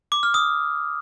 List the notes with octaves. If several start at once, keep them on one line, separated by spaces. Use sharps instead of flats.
D6
F6
D#6